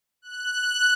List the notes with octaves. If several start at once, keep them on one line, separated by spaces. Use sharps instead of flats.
F#6